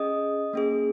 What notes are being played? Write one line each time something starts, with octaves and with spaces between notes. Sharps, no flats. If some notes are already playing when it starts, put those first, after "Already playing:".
Already playing: C#4 G#4 D#5 D#6
A#3 C#4 G#4